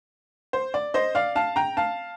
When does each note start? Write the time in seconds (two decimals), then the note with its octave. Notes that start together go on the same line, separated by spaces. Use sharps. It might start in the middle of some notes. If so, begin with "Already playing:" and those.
0.53 C5
0.74 D5
0.94 C5 D#5
1.15 D5 F5
1.36 F5 A5
1.56 G5 A#5
1.77 F5 A5